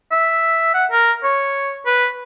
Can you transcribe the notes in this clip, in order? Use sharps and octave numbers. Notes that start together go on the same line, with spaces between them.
E5
F#5
A#4
C#5
B4